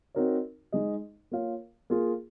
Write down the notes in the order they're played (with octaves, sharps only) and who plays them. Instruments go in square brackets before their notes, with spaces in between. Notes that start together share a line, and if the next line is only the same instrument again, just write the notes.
[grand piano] C4 D#4 F#4 A#4 C#5
G#3 D#4 G#4 D#5
A#3 F4 A#4 C#5 F5
A#3 F4 G#4